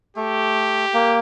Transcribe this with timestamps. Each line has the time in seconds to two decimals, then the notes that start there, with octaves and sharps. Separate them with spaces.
0.16 A3 G4
0.94 A#3